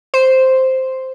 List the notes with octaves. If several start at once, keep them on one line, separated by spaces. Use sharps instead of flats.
C5